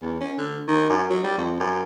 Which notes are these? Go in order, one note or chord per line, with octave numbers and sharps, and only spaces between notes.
E2
C#4
D3
D#3
F#2
F#3
G3
F2
F#2